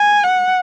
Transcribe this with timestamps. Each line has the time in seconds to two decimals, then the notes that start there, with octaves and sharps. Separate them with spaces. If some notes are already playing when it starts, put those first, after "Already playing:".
Already playing: G#5
0.23 F#5